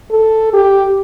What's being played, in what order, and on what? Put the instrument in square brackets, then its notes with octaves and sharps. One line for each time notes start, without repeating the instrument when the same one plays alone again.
[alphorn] A4
G4